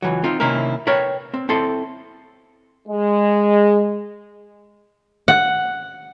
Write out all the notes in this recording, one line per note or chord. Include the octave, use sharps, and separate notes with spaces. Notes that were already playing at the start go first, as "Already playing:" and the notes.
C#2 E3 F#3
C4 D#4 F4
C3 D#3 A#3 C#4 E4 A#4
A#4 B4 C#5 G5
C4
C4 E4 A4 C6
G#3
F#5